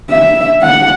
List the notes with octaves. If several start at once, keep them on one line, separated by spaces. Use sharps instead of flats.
E5
F#5